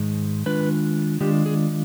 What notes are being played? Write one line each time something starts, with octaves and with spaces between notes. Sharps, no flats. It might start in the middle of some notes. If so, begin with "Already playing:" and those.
Already playing: G#2 D#3 G#3
D#3 G#3 D4 F4 B4
D#3 G#3 D4 F4 G4
G#4